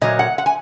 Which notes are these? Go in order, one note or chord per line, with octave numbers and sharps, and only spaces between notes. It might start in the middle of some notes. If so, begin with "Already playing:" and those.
A#2 F#3 A#3 D#5
F#5
F#5
G#5